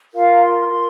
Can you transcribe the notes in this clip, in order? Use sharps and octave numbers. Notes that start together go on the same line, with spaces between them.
F4 A#4 F5
A#5
C6
F4 A#4